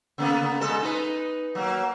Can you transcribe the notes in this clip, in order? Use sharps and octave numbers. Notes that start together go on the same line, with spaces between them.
C#3 A#3 B3
B2 G#3 A4
D#4 B4
F#3 A#3